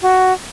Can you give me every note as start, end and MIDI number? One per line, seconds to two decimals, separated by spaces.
0.02 0.33 66